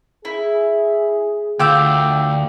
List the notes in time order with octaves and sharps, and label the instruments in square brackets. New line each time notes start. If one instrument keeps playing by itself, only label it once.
[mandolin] E4 [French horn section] G#4
[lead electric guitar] D2 [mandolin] F4 G6 [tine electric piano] G5 D6 E6